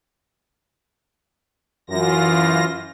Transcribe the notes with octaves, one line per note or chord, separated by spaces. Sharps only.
F#2 E3 F4 A#6